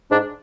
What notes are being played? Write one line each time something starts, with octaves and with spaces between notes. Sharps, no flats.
G#2 D4